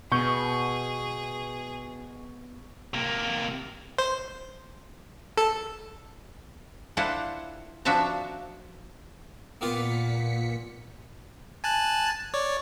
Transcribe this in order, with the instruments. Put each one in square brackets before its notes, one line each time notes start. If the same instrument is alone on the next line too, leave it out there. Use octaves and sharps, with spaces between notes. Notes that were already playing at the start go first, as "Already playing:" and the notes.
[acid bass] B2 [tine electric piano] B3 G6 [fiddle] G#4 [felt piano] C#6
[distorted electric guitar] C3 A#3
[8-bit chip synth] C5
A4
[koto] D4 E4 F4 A4 C5 F#5
F3 D4 F#4 E5 A5 A#5
[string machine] A#2 B6 C#7 [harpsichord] A#3 B3 F4
[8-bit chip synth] G#5 A5 F#6
C#5 D5